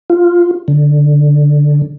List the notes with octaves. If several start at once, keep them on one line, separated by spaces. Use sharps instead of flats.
F4
D3